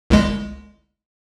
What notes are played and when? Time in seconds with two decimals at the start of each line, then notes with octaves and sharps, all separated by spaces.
0.10 G1 C2 G#3